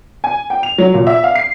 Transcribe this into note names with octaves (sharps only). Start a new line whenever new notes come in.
G#5
G5
F7
F#3
A#2
E5
F5
C7